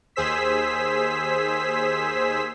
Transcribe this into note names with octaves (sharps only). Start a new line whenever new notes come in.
D#2 G#4 C5 E6 B6